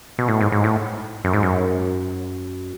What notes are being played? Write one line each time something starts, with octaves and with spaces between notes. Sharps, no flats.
B2
A2
G#2
G#2
A2
F#2
G#2
F#2